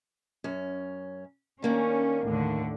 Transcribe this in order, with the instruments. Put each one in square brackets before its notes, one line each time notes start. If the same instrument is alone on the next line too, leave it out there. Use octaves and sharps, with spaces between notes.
[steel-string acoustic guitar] F#2 C#4
[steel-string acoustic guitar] D#3 A#3 D4 [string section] C#4
[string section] D#2 A2 D3